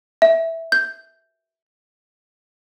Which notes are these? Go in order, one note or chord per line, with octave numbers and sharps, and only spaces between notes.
E5
G6